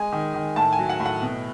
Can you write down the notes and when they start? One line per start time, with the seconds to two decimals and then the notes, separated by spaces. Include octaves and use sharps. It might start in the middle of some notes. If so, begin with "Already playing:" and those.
Already playing: G#3 G#5
0.12 D#3
0.34 D#3
0.56 A2 A5
0.73 G#5
0.79 F#3
0.89 F#5
1.00 A2
1.06 F#5
1.22 B2